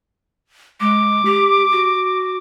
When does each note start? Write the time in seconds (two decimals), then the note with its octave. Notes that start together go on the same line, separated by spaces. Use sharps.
0.81 G#3 D6
1.25 G4
1.72 F#4